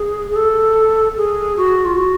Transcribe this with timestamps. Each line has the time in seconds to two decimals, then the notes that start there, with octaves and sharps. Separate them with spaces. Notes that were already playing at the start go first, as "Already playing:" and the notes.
Already playing: G#4
0.31 G#4
0.36 A4
1.17 G#4
1.57 F#4
1.85 F4
1.97 F#4